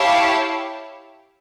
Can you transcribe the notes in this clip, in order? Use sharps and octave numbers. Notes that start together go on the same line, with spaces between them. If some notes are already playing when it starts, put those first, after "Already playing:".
Already playing: E4 G4 C#5 F5 A5